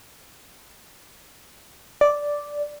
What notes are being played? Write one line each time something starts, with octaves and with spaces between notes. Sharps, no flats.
D5